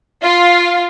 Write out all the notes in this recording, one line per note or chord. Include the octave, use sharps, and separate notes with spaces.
F4